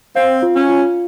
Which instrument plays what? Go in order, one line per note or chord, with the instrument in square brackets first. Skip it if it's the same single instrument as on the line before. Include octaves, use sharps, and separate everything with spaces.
[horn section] C4 [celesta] F5
[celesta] F4
[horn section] C#4
[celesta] F4